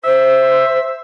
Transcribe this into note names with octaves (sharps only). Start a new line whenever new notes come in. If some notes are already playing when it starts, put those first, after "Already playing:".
C5 E5